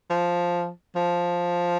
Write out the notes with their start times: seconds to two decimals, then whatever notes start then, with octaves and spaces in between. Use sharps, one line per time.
0.10 F3
0.96 F3